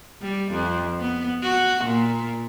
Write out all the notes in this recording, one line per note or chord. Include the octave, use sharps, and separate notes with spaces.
G3
F2
B3
F#4
A#2